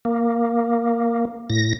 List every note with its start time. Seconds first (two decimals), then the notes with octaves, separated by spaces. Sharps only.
0.05 A#3
1.50 A2 A#6